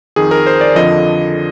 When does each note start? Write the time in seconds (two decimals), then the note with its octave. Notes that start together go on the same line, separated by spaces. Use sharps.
0.16 F2 D#3 G#4
0.31 A#4
0.47 C5
0.61 D5
0.75 F2 D3 F3 D#5